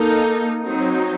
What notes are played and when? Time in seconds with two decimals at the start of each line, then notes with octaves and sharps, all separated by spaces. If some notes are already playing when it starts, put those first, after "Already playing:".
Already playing: A#3 D#4 A4
0.62 F#3 C4 D#4